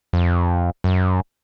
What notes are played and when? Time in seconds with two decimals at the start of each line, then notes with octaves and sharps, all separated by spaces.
0.13 F2
0.84 F#2